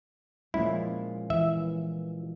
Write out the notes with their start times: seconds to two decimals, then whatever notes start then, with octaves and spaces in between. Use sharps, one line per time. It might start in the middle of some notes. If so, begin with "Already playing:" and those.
0.54 A#2 F3 G#3 C#4 E4
1.30 E3 E5